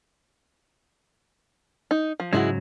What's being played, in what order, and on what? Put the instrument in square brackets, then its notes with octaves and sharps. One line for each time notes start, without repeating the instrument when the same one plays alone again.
[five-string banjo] D#4
F3
[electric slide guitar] G#2 C#3 F#3 [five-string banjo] G#3 E4 F#4